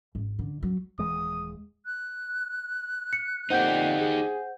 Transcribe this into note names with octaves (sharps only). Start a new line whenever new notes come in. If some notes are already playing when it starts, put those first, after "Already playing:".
G#1
D3
F#3
D#1 E3 G#3 D#6
F#6
C#7
F2 A#2 D#4 G4 C5 F#5 G6
G#4